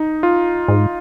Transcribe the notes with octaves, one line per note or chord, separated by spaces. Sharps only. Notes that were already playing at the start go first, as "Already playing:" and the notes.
Already playing: D#4
F4
G#2